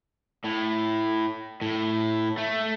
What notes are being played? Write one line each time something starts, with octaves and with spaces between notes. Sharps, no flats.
A2
A2
A3